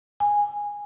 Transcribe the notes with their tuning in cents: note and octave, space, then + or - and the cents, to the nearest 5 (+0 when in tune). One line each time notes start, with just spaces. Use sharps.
G#5 -10